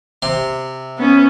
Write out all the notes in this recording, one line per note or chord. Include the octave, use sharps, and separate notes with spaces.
C3 C6
B3 C#4